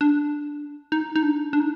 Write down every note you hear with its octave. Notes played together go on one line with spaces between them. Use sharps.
D4
D#4
D#4
D4
D4
D#4